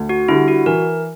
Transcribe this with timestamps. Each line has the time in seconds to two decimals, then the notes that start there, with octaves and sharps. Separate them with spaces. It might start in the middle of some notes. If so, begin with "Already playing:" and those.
Already playing: D2
0.09 F#4
0.29 D3 G3 E4
0.48 F#4
0.66 E3 A#4